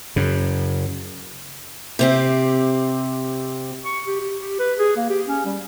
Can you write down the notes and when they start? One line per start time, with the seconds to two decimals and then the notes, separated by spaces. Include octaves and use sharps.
0.16 F#2 C#3
1.99 C3 C4 G4
3.85 C#6
4.06 G4
4.20 G4
4.39 G4
4.59 B4
4.78 G#4
4.96 A#3
5.09 G4
5.27 C#4
5.45 G3